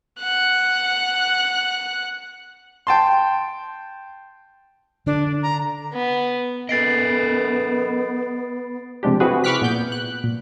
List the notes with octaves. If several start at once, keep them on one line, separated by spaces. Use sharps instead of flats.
F#5 F#6
G5 A5 C6
D3 D4
A#5
B3
B3 A4 A#4 D#5 A6 C7 D7
C3 F3 G#3 D4 G4
C4 E4 F#4 G#4 B4
B5 C#6 D6 F6 F#6 B6
A#2 B3 G6
F#6
A#2